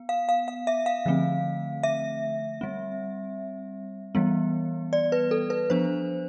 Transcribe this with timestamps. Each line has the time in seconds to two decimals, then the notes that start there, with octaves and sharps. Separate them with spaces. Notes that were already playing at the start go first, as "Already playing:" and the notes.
Already playing: B3
0.09 F5
0.29 F5
0.48 F5
0.67 E5
0.86 F5
1.06 D3 F3 A3 C4
1.83 E5
2.61 G3 C4
4.15 E3 G3 B3
4.93 D5
5.12 B4
5.31 A4
5.50 B4
5.70 F3 B3 D4 C5